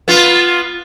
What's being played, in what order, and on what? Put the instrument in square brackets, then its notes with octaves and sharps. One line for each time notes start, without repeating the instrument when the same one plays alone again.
[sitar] B3 F4